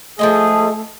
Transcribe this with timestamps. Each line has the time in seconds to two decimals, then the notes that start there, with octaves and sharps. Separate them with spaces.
0.19 F3 G#3 A3 G#4 D#5